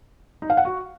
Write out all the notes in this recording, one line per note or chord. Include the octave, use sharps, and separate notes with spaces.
D#4
F5
F#5
F#4